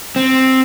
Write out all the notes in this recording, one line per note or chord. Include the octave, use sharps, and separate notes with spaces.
C4